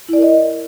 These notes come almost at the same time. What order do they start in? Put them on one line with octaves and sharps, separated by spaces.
E4 D5 A#4 D#5